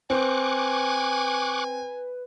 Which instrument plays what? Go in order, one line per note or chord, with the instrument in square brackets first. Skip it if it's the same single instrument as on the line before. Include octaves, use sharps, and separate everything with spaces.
[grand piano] C4 [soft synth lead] B4 [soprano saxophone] G#5 [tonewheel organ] C#6 D6 F#6